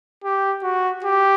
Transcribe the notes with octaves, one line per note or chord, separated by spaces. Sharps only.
G4
F#4
G4